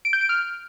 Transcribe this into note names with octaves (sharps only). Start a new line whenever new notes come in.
D7
G6
D7
F6